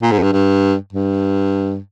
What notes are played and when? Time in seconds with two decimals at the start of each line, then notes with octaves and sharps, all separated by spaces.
0.02 A#2
0.12 G#2
0.18 F2
0.22 G2
0.32 G2
0.93 G2